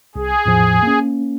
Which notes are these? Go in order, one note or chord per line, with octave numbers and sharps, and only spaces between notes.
C2 G#4
E2 A2 F3
A#3 C#4